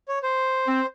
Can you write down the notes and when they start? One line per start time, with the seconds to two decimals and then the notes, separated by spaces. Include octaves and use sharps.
0.08 C#5
0.23 C5
0.68 C4